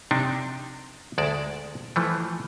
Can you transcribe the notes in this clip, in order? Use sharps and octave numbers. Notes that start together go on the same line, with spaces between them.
C3 D4 D#4
D2 G#3 D5 A5
E3 F3 A3